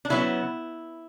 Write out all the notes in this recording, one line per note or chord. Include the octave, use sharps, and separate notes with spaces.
D4
C#3 F#3 B3 E4